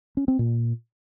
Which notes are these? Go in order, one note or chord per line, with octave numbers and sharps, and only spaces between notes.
C#4
C4
A#2